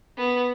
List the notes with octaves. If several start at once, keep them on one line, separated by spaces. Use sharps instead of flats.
B3